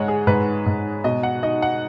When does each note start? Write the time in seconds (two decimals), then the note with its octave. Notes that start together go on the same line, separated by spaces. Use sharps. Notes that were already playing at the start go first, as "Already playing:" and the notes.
Already playing: G#2 G#3 C#5 D#5 F#5
0.08 G#4
0.27 G#2 B4
0.66 G#2
1.04 B2 D#5
1.23 F#5
1.43 D#4 D#5
1.62 F#5